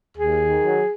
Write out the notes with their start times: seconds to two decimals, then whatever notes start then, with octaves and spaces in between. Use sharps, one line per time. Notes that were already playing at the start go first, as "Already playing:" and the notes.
0.15 D#2 G#4
0.39 D#3
0.63 F#3